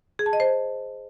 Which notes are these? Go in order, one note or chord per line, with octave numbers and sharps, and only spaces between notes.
G#4
A5
D#5
C5